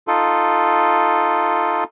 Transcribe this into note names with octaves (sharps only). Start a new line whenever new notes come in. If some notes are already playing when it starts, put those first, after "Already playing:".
D#4 F4 A4